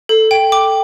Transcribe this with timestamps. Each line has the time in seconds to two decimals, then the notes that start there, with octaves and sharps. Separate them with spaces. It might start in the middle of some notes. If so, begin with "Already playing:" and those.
0.09 A4
0.31 G5
0.52 D6